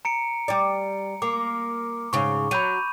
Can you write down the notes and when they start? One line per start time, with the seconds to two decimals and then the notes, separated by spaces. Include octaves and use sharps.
0.05 A#5 C#7 D7
0.48 G3 D5
1.22 A#3 D6
2.13 G#2 C#3 C#6
2.51 F#3 B5 G6 D#7